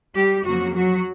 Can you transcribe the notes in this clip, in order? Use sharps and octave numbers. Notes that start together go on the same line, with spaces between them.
G3 G4
F2 C#3 F3 F#3 A#3 F#4
F#3 F#4